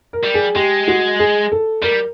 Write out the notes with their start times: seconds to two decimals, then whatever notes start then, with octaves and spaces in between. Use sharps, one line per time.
0.13 A#4
0.24 G3
0.34 G#4
0.55 G#3 G4
0.88 F#4
1.19 G#4
1.52 A4
1.82 G3 A#4